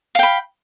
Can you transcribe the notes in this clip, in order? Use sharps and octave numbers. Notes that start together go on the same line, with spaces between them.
F5 G5 B5